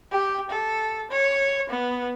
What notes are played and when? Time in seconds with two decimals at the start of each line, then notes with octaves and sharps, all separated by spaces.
0.12 G4
0.50 A4
1.11 C#5
1.70 B3